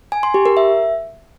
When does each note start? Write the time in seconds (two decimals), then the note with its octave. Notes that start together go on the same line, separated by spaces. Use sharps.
0.12 G#5
0.23 C6
0.34 G4
0.45 A#4
0.57 E5